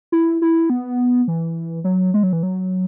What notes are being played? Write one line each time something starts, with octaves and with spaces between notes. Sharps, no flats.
E4
E4
B3
E3
F#3
G#3
F#3
E3
F#3